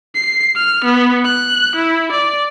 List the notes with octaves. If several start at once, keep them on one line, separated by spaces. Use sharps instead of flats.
C7
F6
B3
F#6
E4
D5